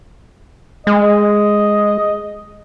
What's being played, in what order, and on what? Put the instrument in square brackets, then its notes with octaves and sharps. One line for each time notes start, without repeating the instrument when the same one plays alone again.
[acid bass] G#3 [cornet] D#5